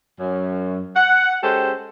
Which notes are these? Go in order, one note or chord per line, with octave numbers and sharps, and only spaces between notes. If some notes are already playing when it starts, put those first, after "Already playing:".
F#2
F#5
G#3 C#4 G4 A4 C5